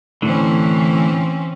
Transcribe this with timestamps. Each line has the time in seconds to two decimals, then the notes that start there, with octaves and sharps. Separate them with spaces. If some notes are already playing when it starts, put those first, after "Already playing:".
0.22 A2 D3 E3 C4 C#4